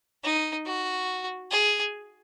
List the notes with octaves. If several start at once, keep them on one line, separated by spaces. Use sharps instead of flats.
D#4
F#4
G#4